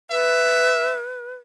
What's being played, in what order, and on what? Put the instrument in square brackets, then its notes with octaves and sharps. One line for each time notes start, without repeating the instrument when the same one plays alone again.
[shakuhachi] B4 [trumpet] E5